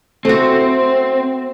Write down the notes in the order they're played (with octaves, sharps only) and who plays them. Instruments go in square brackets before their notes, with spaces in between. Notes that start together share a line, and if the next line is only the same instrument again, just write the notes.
[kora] A3 F#4 [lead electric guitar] C4